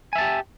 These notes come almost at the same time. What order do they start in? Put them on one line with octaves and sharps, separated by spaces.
G#5 E5 A5 G4